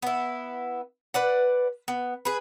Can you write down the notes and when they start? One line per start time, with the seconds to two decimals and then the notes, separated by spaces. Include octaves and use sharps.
0.02 B3 E4
1.14 B4 D5 F#5
1.88 B3
2.25 G#4 B4